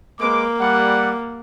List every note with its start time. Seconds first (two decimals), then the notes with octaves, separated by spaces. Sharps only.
0.20 G#3 A#3 B4 D6
0.60 G3 F#5